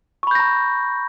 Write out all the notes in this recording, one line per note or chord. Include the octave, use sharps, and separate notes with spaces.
A#5 B5 C#6 G6 A#6